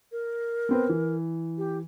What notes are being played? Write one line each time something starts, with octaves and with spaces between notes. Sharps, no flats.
A#4
B3 C4 B4
E3
G4